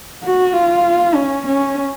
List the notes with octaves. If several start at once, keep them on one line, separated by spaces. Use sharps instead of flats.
F#4
F4
C#4
C#4